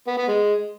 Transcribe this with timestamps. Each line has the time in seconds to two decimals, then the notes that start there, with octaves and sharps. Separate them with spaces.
0.07 B3
0.18 B3
0.28 G#3